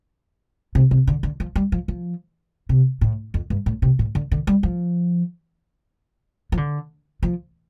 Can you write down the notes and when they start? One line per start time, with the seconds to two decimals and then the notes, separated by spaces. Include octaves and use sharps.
0.75 C3
0.91 C3
1.07 D3
1.23 D3
1.40 F3
1.56 G3
1.72 F3
1.88 F3
2.69 C3
3.01 A2
3.34 F2
3.50 G2
3.66 A2
3.82 C3
3.99 A2
4.15 D3
4.32 D3
4.47 G3
4.63 F3
6.52 F3
6.57 D3
7.23 F3